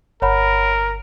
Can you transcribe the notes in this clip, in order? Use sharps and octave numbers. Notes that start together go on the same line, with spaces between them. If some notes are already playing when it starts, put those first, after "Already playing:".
G1 A#4 C#5 F#5 B5